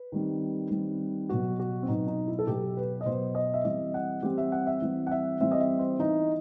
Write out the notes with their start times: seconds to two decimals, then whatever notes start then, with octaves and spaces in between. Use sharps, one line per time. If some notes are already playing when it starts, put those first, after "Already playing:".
Already playing: B4
0.12 D#3 G3 C4
0.70 D#3 G3 C4
1.29 B2 F#3 B3 F#4
1.60 F#4
1.83 C4
1.88 B2 F#3 B3 D#4
2.07 D#4
2.28 E4
2.39 A4
2.47 B2 F#3 B3 G4
2.77 B4
3.01 D#5
3.05 B2 F#3 B3 C5
3.35 D#5
3.54 E5
3.64 E3 G3 C4 D#5
3.94 F#5
4.23 E3 G3 C4 G4
4.38 E5
4.52 F#5
4.67 E5
4.82 E3 G3 C4
5.07 F#5
5.11 E5
5.40 E3 G3 C4 E5
5.52 D#5
5.60 E5
5.79 C5
5.99 E3 B3 D#4